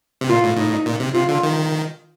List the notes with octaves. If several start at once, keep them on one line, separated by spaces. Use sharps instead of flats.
C3
A#2 F4
A2
A2 D#4
A#2
C3
C3 F4
D3
D#3